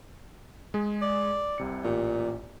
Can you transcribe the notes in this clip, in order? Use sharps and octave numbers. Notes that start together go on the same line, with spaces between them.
G#3 G#4
D5
C2 C3 C#7
A1 A#2 G4